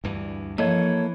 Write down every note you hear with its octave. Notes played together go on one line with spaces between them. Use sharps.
D2 G2 E3
E3 F3 A#3 A4 C#5 D#5